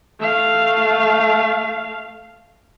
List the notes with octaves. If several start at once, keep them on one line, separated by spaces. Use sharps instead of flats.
A3 F5